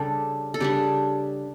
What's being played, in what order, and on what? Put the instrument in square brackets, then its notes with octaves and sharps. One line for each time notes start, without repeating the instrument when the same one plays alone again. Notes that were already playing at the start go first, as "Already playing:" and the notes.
Already playing: [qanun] C#3 G3 D4 G4 A4
A4
C#3 G3 D4 G4